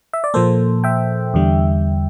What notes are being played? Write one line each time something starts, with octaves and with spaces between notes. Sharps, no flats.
E5
D5
A#2 F3 A#3 A4 C5
E5 G5
E2 D3 G3